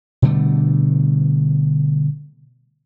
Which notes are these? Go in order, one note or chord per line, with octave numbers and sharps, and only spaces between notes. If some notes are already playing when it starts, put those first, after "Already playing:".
B2 D3 G3 A3